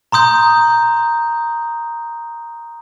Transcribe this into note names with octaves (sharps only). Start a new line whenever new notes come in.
A#5 C6 D#6 G6